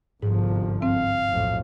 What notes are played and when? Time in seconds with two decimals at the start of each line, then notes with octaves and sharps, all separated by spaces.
0.22 G1 C2 G#2 F3
0.82 C4 F5
1.27 B1 F2 A2